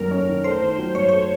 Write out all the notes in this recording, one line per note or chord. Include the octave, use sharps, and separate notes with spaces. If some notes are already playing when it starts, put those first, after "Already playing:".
Already playing: F#2 D#3 A#3 A#4
C#4
D#3
A3 C5
D#3
F#3
F#2 C#5
A3 C#5